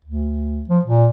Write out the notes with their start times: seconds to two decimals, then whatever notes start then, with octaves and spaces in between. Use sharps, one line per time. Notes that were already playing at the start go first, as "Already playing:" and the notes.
0.05 D2
0.69 F3
0.85 A#2